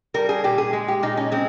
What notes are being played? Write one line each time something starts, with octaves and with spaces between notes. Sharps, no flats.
G3 A#4
G#4
A#2 G4
G#4
G#3
G4
A#2 D#4
C#4
G#3 C4